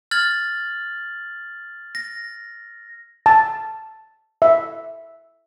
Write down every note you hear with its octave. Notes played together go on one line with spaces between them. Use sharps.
F6 G#6 A6 F#7
A#6
A5
E5